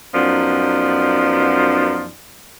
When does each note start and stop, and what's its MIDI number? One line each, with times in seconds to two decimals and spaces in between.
0.14 2.10 42
0.14 2.10 53
0.14 2.10 59
0.14 2.10 63
0.14 2.10 74